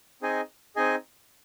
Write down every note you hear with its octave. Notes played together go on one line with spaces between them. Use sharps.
C4 D#4 G#4 D#5 G#5
C4 D#4 G#4 D#5 G#5